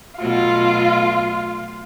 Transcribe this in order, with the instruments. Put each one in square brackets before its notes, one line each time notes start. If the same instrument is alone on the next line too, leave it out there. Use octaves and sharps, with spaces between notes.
[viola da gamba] B2 F#3 A3 [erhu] F4